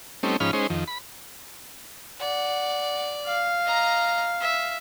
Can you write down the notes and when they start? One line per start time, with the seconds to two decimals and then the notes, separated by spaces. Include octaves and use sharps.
0.23 G3 A3 C4 C#4 D#4
0.40 G#2 F3 C#4 D#4 B5 F6
0.53 G#3 C#4 D#4 C5
0.70 F2 D#3
0.88 B5
2.20 D5 F#5
3.27 F5
3.65 D#5 A#5
4.40 E5